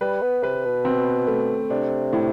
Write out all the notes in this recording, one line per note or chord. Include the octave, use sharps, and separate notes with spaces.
G3 B4
B3
C3 B4
B2
C4
A3
C3 D4
A2